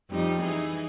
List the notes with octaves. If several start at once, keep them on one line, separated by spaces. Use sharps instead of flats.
F2 G3 D#4
E3 D#4 G#4